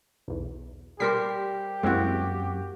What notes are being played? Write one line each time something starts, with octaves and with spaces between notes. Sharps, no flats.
B1 E2
G3 G4 A#4 C5 B6 C7
F#2 G#3 A#3 C4 E4 F#4